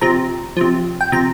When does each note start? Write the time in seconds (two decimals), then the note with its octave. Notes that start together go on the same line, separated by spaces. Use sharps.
0.01 C3 F3 A#5
0.57 C3 F3
1.01 G5
1.12 C3 F3 A#5